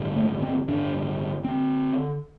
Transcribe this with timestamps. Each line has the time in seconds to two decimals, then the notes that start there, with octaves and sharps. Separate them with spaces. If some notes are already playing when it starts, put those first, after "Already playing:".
Already playing: A1 G2 D3
0.16 A3
0.42 C4
0.68 A1 G2 D3 D4
1.44 D3 C4